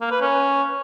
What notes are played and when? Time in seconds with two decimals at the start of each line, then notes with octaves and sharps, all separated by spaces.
0.01 A#3
0.11 B4
0.21 C#4